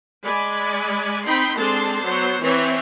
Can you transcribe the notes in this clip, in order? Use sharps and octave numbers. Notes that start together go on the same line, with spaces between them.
G#3 D5 G#5 B5
C4 D#4 G5 B5 C6
G#3 C4 D4 A4 A5 C6
F#3 B3 C5
E3 C4 C#5 E5